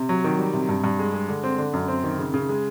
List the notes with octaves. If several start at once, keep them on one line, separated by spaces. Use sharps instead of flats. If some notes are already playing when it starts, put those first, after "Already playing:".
Already playing: C3
F#3
D#3
G3
C3
G2
G2
G#3
G#3
D3
C4
D3
F#2
C4
D#3
C#3
C#3
G#3